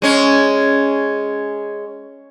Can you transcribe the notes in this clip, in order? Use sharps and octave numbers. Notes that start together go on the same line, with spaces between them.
G#3 C#4